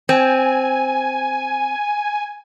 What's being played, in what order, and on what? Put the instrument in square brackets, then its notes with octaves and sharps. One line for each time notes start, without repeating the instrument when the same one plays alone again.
[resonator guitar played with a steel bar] C4 [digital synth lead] G#5